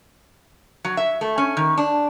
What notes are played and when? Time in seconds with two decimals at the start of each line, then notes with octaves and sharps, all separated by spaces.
0.85 F#3
0.97 E5
1.21 A3
1.38 C#4
1.57 D#3
1.78 D4